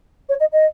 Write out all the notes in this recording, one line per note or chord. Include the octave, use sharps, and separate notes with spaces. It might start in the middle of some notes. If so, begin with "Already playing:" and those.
C#5
D#5
D#5